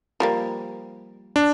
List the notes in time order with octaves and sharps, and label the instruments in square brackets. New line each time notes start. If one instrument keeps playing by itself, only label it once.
[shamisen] F3 G3 A#3
[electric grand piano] D4